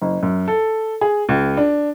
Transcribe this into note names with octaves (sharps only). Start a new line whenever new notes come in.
F#1
F#2
A4
G#4
C#2
D4